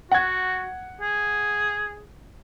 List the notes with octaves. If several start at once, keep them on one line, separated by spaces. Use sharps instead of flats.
F#4 F#5 G#6
G#4